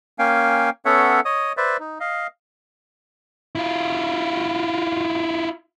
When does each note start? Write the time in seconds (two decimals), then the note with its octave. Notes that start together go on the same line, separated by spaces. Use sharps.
0.19 A#3 C#4 F5 G5 G#5
0.85 B3 C#4 A4 C#5 E5 F#5
1.25 C#5 D#5 D#6
1.57 B4 C5 D5 E5
1.80 D#4
2.00 D#5 F5
3.55 E4 F4